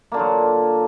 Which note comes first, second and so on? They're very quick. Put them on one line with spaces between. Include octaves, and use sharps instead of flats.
A#3 D3 F4 F#3